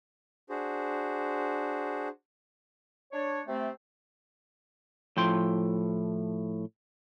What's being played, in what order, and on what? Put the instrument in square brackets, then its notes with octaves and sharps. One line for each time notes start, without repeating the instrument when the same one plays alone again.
[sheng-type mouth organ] D4 F#4 G#4 C5
[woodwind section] D4 C#5
C3 A3 C4
[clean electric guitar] A2 F3 G5 C6